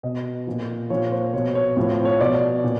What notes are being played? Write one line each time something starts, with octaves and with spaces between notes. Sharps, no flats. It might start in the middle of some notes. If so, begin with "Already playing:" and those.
B2 D#5
A#2 F3
A#2 F3 C#5
C5
B2 C#5
C#5
A2 F3 C#5
C5
C#5
B2 D5
A#2